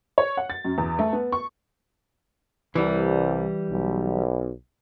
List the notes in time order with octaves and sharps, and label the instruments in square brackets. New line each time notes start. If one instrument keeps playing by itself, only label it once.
[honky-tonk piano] C#5
F#5
A6
F#2
E2
A3
B3
C#6
[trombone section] C2 [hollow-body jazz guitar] E3 G3
[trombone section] B1